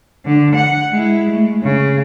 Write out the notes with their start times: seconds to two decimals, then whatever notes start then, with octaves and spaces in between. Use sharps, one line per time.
0.25 D3
0.55 F#5
0.91 G#3 E4
1.29 G#3 A3
1.63 C#3